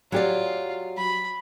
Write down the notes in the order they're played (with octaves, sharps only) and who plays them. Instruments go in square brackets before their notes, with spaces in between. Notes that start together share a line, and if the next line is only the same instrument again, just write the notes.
[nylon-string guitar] F#3 G4 D5 [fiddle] F4
[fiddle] B5